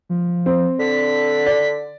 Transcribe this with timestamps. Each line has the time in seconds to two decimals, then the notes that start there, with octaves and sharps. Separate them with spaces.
0.10 F3
0.46 C4
0.79 D3 B6
1.46 D5